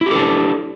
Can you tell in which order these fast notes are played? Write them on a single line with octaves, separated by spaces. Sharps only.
E4 G4 A4 D4